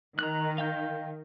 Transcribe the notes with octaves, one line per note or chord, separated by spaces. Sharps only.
D#3 A#5 F#6
F5 G5 G6